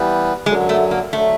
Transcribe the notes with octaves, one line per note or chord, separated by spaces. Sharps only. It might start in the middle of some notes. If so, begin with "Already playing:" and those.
Already playing: E3 G3 B3
F#2 D3 F#3 G#3
A3
A#3
D3 F#3 A3